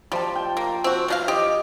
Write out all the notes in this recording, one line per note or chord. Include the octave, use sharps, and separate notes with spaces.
F3 G3 A5
G5
A#3
C4 F#4
B2 D4 F5
G4 D5 D#5